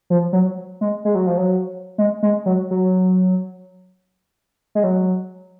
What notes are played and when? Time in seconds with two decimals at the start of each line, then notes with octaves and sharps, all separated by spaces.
0.10 F3
0.33 F#3
0.81 G#3
1.05 G#3
1.15 F#3
1.26 F3
1.37 F#3
1.98 G#3
2.23 G#3
2.46 F#3
2.71 F#3
4.75 G#3
4.84 F#3